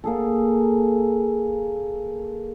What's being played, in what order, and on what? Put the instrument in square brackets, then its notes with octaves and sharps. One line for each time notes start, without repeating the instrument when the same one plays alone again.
[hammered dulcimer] A#3 G#4 A4